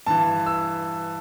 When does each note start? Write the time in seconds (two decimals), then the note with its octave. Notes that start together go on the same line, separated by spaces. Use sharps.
0.07 G2 E3 A5
0.46 E6